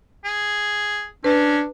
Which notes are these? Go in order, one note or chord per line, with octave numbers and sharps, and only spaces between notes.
G#4
C#4 D4 B4